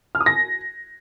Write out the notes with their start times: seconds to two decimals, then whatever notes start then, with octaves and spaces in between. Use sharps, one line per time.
0.15 F6
0.21 D#6
0.26 A#6